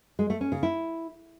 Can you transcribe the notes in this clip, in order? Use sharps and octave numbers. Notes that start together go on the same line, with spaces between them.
G#3
A3
C#4
C#3
E4